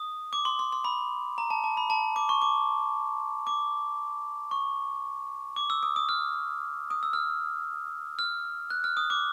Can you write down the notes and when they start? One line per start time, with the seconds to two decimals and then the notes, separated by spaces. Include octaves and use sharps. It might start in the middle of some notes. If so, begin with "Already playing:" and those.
Already playing: D#6
0.33 D6
0.45 C6
0.59 C6
0.73 C6
0.84 B5
1.38 A#5
1.50 A5
1.64 A5
1.77 B5
1.90 A5
2.16 D6
2.29 C#6
2.42 D6
3.47 D6
4.51 C#6
5.56 D6
5.70 E6
5.83 D#6
5.96 D#6
6.09 F6
6.90 D#6
7.03 E6
7.13 F6
8.19 F6
8.70 F#6
8.84 F6
8.97 D#6
9.10 D6